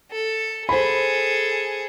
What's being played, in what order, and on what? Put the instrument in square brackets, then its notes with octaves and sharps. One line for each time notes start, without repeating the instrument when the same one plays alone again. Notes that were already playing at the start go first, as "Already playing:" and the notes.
[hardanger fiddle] A4
[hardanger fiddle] G#4 A4 [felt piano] C5 B5